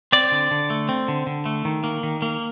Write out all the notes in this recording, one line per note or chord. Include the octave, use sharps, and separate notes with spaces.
C4 D5
D3
D3
A3
C4
D3
D3
A3
D#3
A#3
D#3
A#3